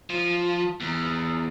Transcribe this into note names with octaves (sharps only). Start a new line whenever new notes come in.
F3
E2